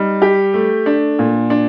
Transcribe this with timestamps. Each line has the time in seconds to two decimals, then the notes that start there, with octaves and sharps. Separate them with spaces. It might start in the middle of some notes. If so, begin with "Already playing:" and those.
Already playing: G3 D#4
0.22 G4
0.54 A3
0.86 D4
1.19 A#2
1.50 D4